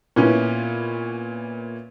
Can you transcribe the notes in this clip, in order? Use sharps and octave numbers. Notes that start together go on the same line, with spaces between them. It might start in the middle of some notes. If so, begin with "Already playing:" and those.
A#2 B3 C#4 E4